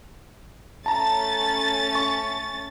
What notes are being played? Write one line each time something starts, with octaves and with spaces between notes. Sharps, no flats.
A3 C#4 A5 A#5 A6
C#6